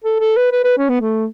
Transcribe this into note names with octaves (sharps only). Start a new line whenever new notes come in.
A4
A4
B4
B4
B4
C#4
B3
A3